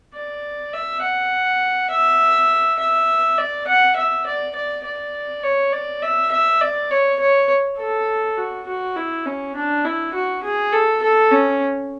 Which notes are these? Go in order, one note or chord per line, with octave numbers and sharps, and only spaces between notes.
D5
E5
F#5
E5
E5
D5
F#5
E5
D5
D5
D5
C#5
D5
E5
E5
D5
C#5
C#5
A4
F#4
F#4
E4
C#4
D4
E4
F#4
G#4
A4
A4
C#4